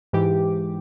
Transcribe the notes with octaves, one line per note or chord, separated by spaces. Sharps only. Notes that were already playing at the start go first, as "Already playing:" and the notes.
G#2 E3 G4 D6